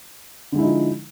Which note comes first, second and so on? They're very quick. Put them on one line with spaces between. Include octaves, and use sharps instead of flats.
D3 G#3 E4 D#4 F3